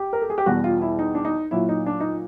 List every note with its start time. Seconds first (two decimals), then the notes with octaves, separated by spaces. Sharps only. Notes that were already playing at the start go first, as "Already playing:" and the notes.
Already playing: G4
0.13 A#4
0.22 A4
0.30 G#4
0.38 G4
0.46 E2 B2 G3 F#4
0.64 F4
0.81 E4
0.99 D#4
1.15 D4
1.25 D#4
1.51 A#2 F#3 E4
1.69 D#4
1.86 D4
2.00 D#4